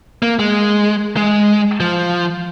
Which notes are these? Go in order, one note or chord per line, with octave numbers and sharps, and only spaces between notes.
A#3
G#3
G#3
F3